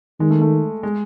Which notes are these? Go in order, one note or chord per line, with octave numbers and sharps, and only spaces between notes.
D#3 G#3
A3
A3
G#3